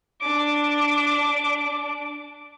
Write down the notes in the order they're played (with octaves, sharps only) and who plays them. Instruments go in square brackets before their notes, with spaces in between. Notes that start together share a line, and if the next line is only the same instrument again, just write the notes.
[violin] D4 D6